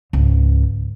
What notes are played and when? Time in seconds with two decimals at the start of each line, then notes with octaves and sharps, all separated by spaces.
0.13 C#2 G#2